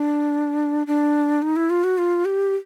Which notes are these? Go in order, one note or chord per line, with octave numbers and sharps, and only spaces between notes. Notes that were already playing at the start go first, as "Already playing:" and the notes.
Already playing: D4
D4
D#4
E4
F4
F#4
F4
G4